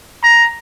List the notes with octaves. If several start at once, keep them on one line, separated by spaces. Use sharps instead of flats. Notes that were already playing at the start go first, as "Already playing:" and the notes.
A#5